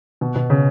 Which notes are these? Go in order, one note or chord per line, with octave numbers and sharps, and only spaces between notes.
B2
B2
C#3